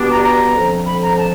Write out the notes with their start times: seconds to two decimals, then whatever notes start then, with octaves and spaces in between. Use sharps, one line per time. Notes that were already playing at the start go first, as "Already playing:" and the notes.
Already playing: B2 G3 B3 D4
0.12 A#5
0.23 A#5
0.55 F2 D3 F3
0.86 B5
1.02 A#5
1.19 A5